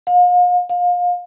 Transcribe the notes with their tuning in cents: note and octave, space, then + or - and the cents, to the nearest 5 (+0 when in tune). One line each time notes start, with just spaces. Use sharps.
F5 +40
F5 +30